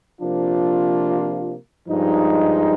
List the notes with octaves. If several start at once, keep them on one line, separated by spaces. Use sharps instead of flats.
C3 F3 A#3 D4 F4
G2 F3 G#3 D#4